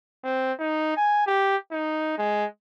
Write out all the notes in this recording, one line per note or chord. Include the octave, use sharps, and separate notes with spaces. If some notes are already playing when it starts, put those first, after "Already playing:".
C4
D#4
G#5
G4
D#4
G#3